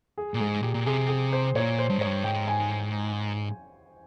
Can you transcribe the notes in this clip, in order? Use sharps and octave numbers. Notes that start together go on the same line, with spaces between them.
G#4
A#2
G#2 G#4
A#2 G4
A#2
C3 G#4
G#4
C5
A#2 C#5
C5
G2
G#2 C#5
G2
G#2 G5
G#5